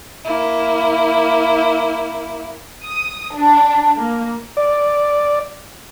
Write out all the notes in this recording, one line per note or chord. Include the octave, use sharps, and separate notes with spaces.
A#3 E4
D#6
D4
A#3
D5